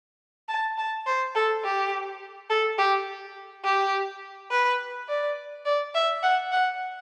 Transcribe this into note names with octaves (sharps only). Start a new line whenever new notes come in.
A5
A5
C5
A4
G4
A4
G4
G4
B4
D5
D5
E5
F#5
F#5